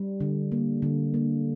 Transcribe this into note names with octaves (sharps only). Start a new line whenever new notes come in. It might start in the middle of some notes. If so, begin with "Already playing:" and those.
Already playing: G3
D3
A#3
D3
A#3